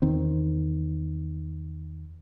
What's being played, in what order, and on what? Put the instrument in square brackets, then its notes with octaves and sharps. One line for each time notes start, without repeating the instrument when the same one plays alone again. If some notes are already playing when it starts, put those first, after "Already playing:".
[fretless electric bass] E2 D#3 C4